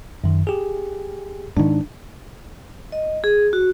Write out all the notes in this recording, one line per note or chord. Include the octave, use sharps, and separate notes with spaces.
F#2 D#3
G4 G#4
G#2 D#3 D4
D#5
G#4
F#4